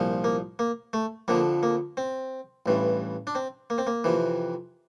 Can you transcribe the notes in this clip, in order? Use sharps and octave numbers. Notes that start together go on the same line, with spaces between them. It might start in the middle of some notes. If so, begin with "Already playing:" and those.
Already playing: C2 A#2 F3
A#3
A#3
A3
F2 D3 F3 A#3
A#3
C4
A1 G2 E3
D4
C4
A#3
C4
A#3
F2 C3 E3